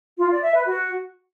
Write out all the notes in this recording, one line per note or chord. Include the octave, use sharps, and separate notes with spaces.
F4
D5
E5
B4
F#4